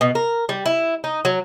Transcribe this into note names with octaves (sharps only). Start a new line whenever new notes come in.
B2
A#4
G3
E4
D#4
F#3